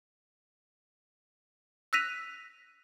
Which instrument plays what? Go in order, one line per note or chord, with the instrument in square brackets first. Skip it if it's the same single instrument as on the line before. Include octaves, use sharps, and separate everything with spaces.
[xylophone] E6 F#6 A#6 B6 D#7 F7